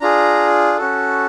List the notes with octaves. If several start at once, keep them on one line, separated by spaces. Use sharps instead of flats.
D4 F4 G#4 A#5
C#4 F#4 A4